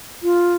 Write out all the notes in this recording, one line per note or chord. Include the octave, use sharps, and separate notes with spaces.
F4